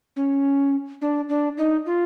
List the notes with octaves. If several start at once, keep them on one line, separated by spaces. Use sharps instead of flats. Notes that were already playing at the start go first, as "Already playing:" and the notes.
C#4
D4
D4
D#4
F4